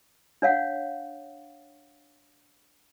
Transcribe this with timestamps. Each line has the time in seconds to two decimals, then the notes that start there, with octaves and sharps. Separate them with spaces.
0.42 D4 C#5 F5 F#5